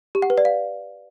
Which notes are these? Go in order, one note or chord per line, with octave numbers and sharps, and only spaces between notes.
G4
F#5
B4
D5
F5